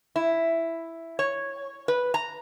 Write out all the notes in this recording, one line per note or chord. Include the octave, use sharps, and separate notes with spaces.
E4
C#5
B4
A#5